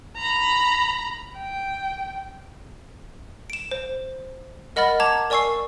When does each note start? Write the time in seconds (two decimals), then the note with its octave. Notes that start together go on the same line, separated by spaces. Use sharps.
0.17 A#5 B5
1.37 G5
3.50 D7 E7
3.71 C5
4.76 A#4 D#5 F#5 B5 F6 A6
5.00 A5 A#5 D6 G#6
5.30 A#4 D5 G#5 C#6 E6 C7